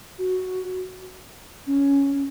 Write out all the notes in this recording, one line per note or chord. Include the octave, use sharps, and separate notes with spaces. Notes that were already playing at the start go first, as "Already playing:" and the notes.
F#4
C#4